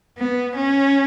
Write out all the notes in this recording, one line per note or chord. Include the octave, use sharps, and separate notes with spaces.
B3
C#4